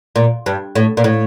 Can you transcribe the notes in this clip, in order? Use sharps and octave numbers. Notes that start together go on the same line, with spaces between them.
A#2
G2
A2
A#2
A2